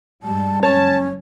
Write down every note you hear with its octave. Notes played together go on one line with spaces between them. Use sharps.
G2 G3 G#3 A5
F#1 C#4 C#5 A5